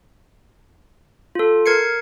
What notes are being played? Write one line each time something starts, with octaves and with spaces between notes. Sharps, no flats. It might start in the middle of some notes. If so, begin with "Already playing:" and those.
F4 A4
A#4 G#6 C7 C#7